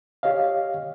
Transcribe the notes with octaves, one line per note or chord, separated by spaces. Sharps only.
G4 C#5 D#5 F5